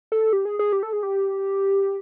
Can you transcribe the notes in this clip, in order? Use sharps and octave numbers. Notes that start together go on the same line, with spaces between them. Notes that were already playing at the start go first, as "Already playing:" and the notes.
A4
G4
G#4
G#4
G4
A4
G#4
G4